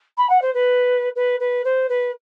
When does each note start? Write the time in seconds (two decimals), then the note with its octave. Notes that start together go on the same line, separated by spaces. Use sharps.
0.17 B5
0.29 F#5
0.41 C5
0.54 B4
1.15 B4
1.39 B4
1.64 C5
1.89 B4